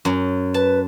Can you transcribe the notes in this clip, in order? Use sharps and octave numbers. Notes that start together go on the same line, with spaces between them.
F#2
B4 A5